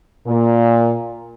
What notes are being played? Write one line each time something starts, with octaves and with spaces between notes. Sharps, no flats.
A#2